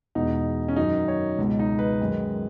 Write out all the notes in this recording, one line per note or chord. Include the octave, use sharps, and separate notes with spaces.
E2 B2 G#3 D#4
C#4
F#2 D#3 F#3 D#4
C#5
C#2 B2 G#3
D#4
B4
F#2 D#3 G#3